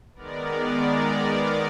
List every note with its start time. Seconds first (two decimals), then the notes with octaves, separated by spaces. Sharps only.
0.15 D#3 G#3 B3 A#4 D5
0.50 A#4 D5